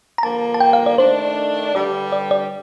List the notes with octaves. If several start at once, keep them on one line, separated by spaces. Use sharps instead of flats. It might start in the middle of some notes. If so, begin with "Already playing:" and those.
A#5
G2 D3 F3 A#3 A5
A5
G5
F5
D5
D#3 A3 D4 C5
G2 D3 G3 D5
D5
D5